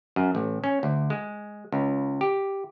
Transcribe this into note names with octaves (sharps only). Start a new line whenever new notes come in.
F#2
A1
C#4
D2
G#3
C#2
G4